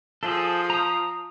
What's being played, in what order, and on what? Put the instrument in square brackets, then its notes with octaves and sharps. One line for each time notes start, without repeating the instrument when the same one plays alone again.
[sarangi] F3 [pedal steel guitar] G#4 A4
[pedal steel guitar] A#5 D#6